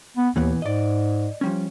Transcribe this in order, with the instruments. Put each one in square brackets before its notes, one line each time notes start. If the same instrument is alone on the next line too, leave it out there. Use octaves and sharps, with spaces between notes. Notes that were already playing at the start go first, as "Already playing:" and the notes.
[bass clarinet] B3
[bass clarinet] D#2 [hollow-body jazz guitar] A#2 E3 B3
[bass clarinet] G#2 [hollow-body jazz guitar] D5 D#5
[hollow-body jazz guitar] F3 G3 C#4